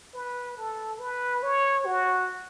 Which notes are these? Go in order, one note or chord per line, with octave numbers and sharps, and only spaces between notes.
B4
A4
B4
C#5
F#4